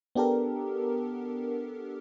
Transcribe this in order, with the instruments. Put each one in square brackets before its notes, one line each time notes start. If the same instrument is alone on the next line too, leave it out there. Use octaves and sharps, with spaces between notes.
[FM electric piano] B3 D4 G4 A4 A#4